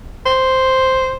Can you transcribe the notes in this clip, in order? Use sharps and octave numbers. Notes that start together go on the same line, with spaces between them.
C5